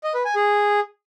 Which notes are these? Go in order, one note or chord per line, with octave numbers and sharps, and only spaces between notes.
D#5
B4
G#5
G#4